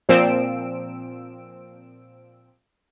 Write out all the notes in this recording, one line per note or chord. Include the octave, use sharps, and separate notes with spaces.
A#2 F3 C4 E6 D7